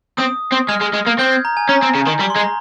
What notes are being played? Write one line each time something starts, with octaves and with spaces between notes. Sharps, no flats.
C4 D#6
C4
G#3 F6
G#3
G#3
A#3
C4 G6
G#6
A#5
G#5
C#4 A#5
C4
C#3
D#3
G3 C#6
C6
G#3
A#5